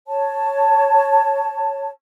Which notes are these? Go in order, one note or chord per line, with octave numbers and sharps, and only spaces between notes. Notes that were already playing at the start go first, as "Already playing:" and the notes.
C#5 A5